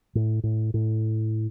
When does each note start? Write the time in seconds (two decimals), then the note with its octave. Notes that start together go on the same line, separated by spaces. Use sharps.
0.15 A2
0.43 A2
0.74 A2